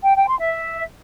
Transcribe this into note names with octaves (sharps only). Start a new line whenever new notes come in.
G5
G5
C6
E5